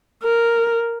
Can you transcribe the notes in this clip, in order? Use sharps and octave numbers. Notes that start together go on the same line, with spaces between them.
A#4